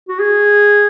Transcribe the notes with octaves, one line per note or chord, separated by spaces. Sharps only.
F#4
G#4